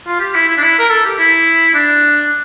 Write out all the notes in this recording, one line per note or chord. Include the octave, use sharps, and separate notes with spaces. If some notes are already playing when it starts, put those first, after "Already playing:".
F4
G4
E4
E4
D4
E4
A#4
A4
G4
E4
D4